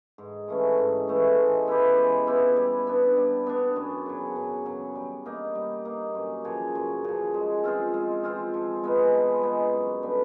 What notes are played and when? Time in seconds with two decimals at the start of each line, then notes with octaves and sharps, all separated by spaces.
0.18 G#2
0.48 E3 A3 C#4
0.78 G#2
1.08 E3 A3 C#4
1.38 G#3
1.67 B3 E4 G4
1.97 G#3
2.27 B3 E4 G4
2.57 G3
2.87 B3 D4
3.17 G3
3.47 B3 D4
3.76 F#2
4.06 C#3 F#3
4.36 F#2
4.66 C#3 F#3
4.95 G3
5.25 A#3 D#4
5.55 G3
5.85 A#3 D#4
6.15 F#2
6.45 C#3 F3
6.75 F#2
7.04 C#3 F3
7.34 G#3
7.64 C4 F4 G#4
7.94 G#3
8.23 C4 F4 G#4
8.54 F3
8.83 G#3 B3 D#4
9.14 F3
9.43 G#3 B3 D#4
9.73 F#2
10.03 D3 G3 B3